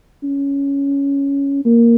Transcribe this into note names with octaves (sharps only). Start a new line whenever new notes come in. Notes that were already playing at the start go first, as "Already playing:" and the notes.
C#4
A#3